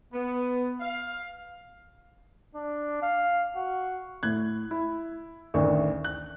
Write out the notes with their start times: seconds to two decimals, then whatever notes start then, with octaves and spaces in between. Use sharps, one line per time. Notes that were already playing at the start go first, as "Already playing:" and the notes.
0.13 B3
0.81 F5
2.55 D4
3.02 F5
3.56 F#4
4.23 A2 F#6 G#6
4.71 E4
5.54 A1 D2 D#3 D4 C#6
6.04 F#6